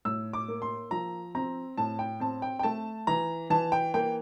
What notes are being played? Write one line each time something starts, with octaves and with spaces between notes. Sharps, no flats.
A2 E6
D6
A#3
C6
F3 A#5
C4 A#5
A2 A5
G5
C4 A5
G5
G5
A3 A5
E3 A#5
E3 A5
G5
A#3 G5